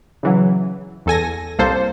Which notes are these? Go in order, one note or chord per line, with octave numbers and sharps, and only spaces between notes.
C#3 E3 F#3
E2 A4 G#5 A#6
C2 A#3 A4 C5